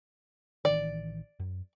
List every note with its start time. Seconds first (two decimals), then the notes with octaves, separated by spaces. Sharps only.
0.65 A1 D#3 E3 D5
1.40 F#2